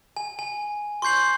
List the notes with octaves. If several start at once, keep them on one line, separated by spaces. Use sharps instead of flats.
G#5
G#5
C6 C#6 G6 C7 F#7